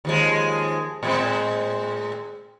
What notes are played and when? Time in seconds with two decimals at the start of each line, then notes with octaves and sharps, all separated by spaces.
0.05 D#2 F3 G#3
1.03 A2 G#3 C4